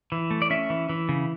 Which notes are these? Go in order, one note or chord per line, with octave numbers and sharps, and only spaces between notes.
E3
A3
D5
C#4 E5
E3
E3
C#3